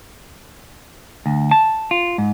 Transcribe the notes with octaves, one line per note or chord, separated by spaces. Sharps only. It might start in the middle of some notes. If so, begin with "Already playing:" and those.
D2
A5
F4
G#2